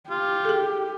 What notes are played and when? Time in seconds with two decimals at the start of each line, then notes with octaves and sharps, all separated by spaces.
0.10 F4 G4
0.45 G#4 A4